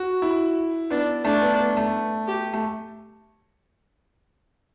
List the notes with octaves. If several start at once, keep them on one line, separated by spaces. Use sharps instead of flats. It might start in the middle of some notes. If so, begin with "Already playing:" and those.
Already playing: F#4
E4
B3 D4
A3 D4
B3
B3
A3
G4
A3